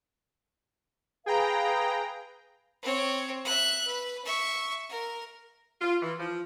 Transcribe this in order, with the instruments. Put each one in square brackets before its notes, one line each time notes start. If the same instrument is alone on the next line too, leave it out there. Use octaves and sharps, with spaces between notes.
[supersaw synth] G#4 G5 A#5 [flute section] B4 F5
[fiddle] C4 C#5
E5 F#6
B4
E5 C#6
A#4
[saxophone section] F4
E3
F3